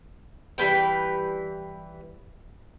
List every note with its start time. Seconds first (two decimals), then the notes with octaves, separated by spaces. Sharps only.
0.58 E3 G3 B4 G5